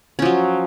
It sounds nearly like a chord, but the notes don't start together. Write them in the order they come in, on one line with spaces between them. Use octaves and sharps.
C#4 F3 F#3